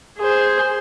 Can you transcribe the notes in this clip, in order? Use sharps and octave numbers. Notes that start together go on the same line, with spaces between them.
G#4 C5